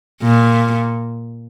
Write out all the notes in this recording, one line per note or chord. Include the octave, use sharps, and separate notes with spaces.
A#2